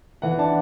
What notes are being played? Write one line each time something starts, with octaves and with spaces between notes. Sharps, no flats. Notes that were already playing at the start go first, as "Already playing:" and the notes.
E3 F#5
D4 A5